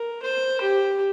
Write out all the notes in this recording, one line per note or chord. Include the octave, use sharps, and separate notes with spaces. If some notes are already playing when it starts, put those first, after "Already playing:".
Already playing: A#4
C5
G4